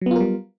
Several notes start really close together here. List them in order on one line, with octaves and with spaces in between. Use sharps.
F#3 B3 F4 A#4 G3